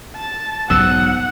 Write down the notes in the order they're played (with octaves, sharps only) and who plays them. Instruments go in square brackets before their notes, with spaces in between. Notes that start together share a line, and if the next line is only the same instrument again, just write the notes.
[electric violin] A5
[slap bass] B1 G#2 [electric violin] F#5 [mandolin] E6